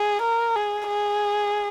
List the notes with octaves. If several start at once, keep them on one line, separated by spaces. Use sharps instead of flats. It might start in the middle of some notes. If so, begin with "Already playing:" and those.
Already playing: G#4
A#4
G#4
G#4